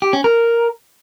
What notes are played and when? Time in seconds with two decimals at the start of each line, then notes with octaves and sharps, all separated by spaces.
0.02 G4
0.13 C#4
0.24 A#4